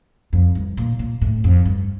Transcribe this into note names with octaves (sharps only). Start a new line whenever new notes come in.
F2
G2
A#2
A#2
A2
F2
G2